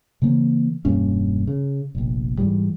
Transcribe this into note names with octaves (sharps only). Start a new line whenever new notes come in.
C#3 E3 A#3 C4
E1 G2 A#3 C#4
C#3
F1 A#1
G#2 E3 G3